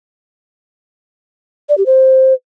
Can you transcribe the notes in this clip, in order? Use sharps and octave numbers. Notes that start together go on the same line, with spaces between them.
D5
G4
C5